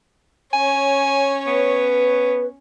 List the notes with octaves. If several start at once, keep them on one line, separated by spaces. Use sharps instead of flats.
C#4 C#5 G#5
B3 B4